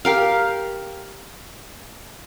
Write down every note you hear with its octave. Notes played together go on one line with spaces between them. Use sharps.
G4 A#4 F5